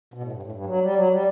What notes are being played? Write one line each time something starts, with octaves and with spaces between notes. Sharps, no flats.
B2
A2
G2
A2
G2
F#3
G3
F#3
G3